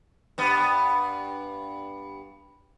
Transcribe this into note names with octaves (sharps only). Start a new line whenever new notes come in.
G2 B3